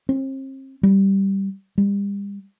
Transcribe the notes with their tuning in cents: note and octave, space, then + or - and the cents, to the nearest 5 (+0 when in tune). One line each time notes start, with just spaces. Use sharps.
C4 +40
G3 -5
G3 +40